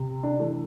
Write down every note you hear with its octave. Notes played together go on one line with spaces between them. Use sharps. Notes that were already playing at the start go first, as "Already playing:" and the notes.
Already playing: C3
D4
E3 A3